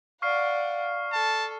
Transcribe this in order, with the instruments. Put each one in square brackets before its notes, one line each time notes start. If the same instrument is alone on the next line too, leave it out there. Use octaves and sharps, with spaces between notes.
[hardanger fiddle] D5 F#5 [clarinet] F5 [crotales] C#6 F6 C7
[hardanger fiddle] A4 [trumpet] A5